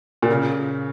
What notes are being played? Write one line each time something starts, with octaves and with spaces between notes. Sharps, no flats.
A#2
C#3